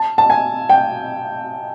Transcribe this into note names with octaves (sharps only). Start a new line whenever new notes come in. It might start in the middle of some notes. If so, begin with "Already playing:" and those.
Already playing: A5
A5
G#5
G5